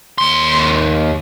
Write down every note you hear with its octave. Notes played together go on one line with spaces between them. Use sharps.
D#2 C6